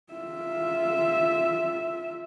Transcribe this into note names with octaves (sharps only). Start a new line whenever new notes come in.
F4 E5